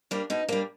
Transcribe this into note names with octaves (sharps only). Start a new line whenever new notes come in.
G3 A#3 D4
B2 D#4
G3 A#3 D4